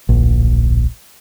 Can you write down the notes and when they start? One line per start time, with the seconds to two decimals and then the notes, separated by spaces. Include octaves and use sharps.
0.09 D1 A#1